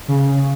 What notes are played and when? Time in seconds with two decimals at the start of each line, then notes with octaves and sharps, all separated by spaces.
0.08 C#3